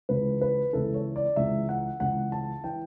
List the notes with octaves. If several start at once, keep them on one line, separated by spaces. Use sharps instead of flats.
C#2 C#3 E3 B4
B4
C#2 C#3 E3 A4
C#5
D5
C#2 C#3 E3 E5
F#5
C#2 C#3 E3 F#5
A5
E3 G5